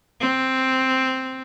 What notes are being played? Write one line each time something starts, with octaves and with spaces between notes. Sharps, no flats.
C4